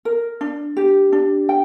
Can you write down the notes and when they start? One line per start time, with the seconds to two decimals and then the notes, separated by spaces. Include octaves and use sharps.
0.05 A#4
0.41 D4
0.77 G4
1.13 D4
1.49 G5